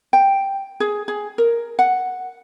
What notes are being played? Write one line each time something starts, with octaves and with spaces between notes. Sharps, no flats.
G5
G#4
G#4
A#4
F#5